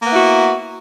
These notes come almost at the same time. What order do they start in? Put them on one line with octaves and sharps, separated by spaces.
A#3 B3 E4 F#4